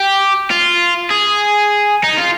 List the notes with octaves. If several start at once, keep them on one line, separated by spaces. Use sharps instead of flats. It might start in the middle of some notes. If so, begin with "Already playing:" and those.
Already playing: G4
F4
G#4
D#4
F4